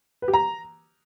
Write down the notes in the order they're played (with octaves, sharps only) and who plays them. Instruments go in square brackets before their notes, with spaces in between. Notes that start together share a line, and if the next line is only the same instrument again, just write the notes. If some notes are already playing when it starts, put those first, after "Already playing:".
[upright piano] B4
G4
A#5